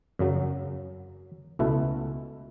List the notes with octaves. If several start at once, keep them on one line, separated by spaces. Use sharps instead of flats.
F#2 C#3 F#3
C#2 B2 A3 E4